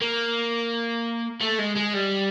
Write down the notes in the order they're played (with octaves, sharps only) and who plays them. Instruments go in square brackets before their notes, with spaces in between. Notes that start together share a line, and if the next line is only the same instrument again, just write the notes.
[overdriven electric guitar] A#3
A3
G#3
G#3
G3